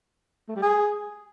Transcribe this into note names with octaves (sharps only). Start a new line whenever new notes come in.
A3
G3
G#4